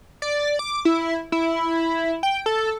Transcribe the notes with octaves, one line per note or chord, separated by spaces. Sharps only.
D5
D6
E4
E4
G5
A4